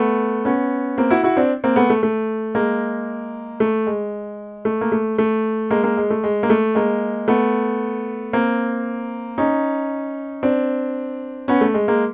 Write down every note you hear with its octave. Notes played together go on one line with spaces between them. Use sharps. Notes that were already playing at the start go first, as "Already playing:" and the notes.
Already playing: A3 B3
B3 C#4
A#3 C4
E4 F#4
E4 F#4
C4 D4
A#3 C4
A3 B3
A3
A3
G#3 A#3
A3
G#3
A3
A#3
A3
A3
G#3 A#3
G#3 A#3
G#3
A3
G#3
A#3
A3
G#3 A#3
A3 B3
A#3 C4
C#4 D#4
C4 D4
B3 C#4
A3
G#3
G#3 A#3